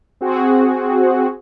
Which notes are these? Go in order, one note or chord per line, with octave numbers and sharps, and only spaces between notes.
C4 F#4 G#4